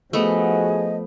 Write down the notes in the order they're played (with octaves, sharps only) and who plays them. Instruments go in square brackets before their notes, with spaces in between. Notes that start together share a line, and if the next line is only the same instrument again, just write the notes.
[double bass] F3 [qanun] A3 B3 [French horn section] D#4 F#4 G#4 [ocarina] D#5